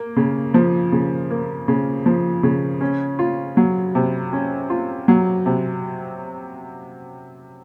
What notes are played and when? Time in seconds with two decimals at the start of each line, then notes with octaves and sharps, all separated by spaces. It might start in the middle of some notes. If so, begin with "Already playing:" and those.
Already playing: A#3
0.16 C#3
0.54 F3
0.92 C#3
1.30 A#3
1.68 C#3
2.06 F3
2.43 C#3
2.81 C#4
3.19 F4
3.57 F#3
3.95 C3
4.33 C#4
4.70 F4
5.08 F#3
5.46 C3